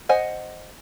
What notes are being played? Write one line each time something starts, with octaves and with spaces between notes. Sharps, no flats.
C5 D#5 F#5 G#5